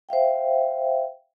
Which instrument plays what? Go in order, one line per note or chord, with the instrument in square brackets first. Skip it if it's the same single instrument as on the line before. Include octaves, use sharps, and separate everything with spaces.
[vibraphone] C5 E5 F5 G5